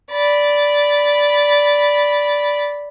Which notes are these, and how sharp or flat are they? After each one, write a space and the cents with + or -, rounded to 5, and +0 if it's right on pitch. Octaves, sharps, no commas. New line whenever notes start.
D5 -10 B5 +0